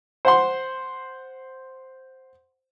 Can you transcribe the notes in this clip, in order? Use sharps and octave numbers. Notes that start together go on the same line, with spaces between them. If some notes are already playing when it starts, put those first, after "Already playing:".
C5 F#5 C6